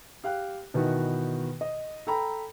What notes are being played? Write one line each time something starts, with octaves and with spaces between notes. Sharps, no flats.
G4 F5 G5 F#6
B2 D#3 E3 B3 F#4
D#5
A4 G5 A#5 B5